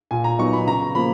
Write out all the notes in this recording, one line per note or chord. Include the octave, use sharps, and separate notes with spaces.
A#2 G#5
A#5
F#3 B3 D#4 C#6
B5
C#3 A#5
F3 A#3 B5